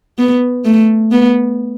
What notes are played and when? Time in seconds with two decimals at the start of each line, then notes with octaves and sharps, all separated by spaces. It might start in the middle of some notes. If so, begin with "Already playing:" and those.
0.18 B3
0.65 A3
1.12 B3